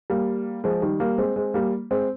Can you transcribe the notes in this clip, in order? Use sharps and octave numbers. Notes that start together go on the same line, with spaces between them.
G3 A#3
F3 G#3
D#3 G3
G3 A#3
G#3 C4
G#3 C4
G3 A#3
G#3 C4